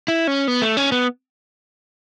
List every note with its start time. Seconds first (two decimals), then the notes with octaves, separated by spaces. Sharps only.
0.08 E4
0.27 C#4
0.48 B3
0.62 A3
0.77 C#4
0.92 B3